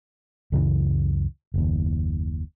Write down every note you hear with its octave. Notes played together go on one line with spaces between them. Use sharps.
C#2 F#2 C#3 E3
F#1 D#2